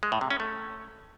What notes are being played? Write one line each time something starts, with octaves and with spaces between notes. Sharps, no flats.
G#3
A2
C3
C#4
A3